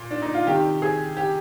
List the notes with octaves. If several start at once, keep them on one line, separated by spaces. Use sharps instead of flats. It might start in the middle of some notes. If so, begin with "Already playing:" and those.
Already playing: A#2
D4
D#4
F4
C3 D#3 G4
G#4
G4